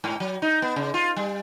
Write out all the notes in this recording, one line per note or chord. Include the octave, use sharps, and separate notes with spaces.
G#2
F#3
D#4
B3
C#3
F4
G3